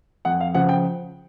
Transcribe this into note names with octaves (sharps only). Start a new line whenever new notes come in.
F2 F#5
F5
C#3 F3 F#5
G5